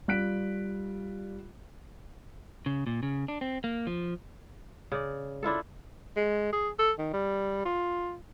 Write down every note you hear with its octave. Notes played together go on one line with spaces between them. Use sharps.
G3 F4 F#6 B6 D7
C#3
A#2
C#3
D4
C4
A#3
F3
C#3 D5
D4 E4 F4 A4
G#3
G#4
A4
D#3
G3
F4